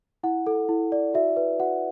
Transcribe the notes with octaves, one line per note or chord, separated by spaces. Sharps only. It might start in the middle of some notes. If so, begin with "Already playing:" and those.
E4 F#5
A4
E4
D5
F#4 E5
B4
F#4 F#5